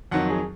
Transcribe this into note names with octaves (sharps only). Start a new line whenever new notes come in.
F2 D#3 F#3 F#5
G#4